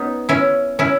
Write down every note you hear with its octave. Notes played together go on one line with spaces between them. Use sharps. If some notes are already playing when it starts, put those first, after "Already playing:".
Already playing: B3 C#4 D#4
C#4 E4
C#4 E4